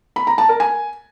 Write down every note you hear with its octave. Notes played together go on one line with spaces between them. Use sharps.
B5
A#5
A5
A#4
G#5